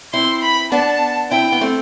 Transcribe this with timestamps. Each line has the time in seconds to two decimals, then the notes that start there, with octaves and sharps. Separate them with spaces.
0.13 C4 E4 C6
0.43 B5
0.72 B3 D4 A5
1.31 C4 E4 G5
1.52 B3
1.61 A3 C4